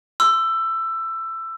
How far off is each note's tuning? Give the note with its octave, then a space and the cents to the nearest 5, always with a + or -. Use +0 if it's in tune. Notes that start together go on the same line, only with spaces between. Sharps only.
C6 +0 E6 +15